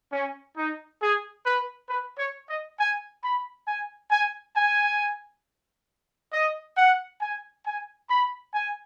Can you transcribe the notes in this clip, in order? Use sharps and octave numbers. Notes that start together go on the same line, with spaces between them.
C#4
D#4
G#4
B4
B4
C#5
D#5
G#5
B5
G#5
G#5
G#5
D#5
F#5
G#5
G#5
B5
G#5